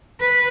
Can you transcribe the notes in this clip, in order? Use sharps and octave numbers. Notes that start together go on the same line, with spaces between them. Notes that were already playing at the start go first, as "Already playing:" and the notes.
B4